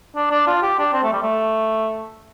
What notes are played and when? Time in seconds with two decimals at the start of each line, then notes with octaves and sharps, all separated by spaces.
0.16 D4
0.31 D4
0.47 F4
0.62 G4
0.79 D4
0.93 C4
1.03 A3
1.13 G3
1.22 A3